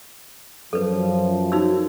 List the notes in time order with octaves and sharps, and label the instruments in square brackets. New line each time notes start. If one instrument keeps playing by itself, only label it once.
[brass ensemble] F#2 F3 [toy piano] A4 B4
[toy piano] D#4 F#4 E6